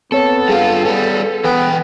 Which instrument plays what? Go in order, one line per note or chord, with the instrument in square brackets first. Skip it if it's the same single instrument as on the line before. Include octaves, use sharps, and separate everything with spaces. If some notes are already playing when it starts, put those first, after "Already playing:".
[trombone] B3 [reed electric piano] C4 C#5 [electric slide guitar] A4
[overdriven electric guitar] G2 F4 [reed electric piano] G#4
[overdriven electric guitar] G3 C#4 [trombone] B3
[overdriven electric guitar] E3 G5 [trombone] B3